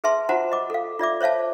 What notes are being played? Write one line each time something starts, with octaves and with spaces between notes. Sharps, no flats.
G#4 B4 E5 A5 C6
F4 F#4 C5 F#5 A5 A#5
D#5 D6
A4 F5
F4 D5 E5 D6
C5 C#5 E5 F5 A5